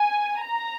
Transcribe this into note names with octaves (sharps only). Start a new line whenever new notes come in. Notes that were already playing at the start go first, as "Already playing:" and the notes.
Already playing: G#5
A#5